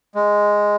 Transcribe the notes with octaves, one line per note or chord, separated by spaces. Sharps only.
G#3